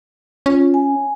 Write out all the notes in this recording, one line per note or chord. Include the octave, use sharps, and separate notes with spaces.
C#4 F4
G#5